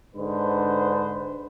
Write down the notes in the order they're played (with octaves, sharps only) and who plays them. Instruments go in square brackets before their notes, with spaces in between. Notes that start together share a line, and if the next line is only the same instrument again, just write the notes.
[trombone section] G#2 D3 B4 C5